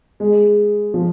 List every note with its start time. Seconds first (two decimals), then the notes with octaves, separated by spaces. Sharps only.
0.20 G#3
0.94 F3